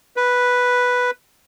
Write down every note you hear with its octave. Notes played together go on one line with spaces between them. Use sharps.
B4